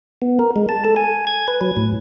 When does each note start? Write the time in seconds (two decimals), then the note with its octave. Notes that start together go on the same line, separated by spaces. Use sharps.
0.22 B3
0.39 A#4
0.56 G#3
0.69 A5
0.85 A4
0.96 G#5
1.27 G#6
1.48 B4
1.61 F#3
1.77 A2